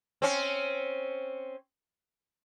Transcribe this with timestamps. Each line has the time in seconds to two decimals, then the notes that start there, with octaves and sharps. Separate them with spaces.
0.22 C4 C#4